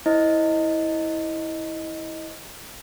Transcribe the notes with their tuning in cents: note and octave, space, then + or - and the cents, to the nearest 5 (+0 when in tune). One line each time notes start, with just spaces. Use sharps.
E4 -20 C5 +25 D#5 +0